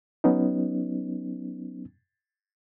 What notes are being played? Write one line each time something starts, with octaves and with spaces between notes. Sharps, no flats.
F#3 B3 C#4 D#4